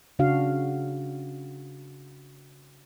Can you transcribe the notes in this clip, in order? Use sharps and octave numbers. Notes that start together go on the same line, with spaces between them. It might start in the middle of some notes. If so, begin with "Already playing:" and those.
C#3 D4 F#4 F5